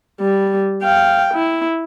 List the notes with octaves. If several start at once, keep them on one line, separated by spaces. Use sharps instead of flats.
G3
F5 G5
E4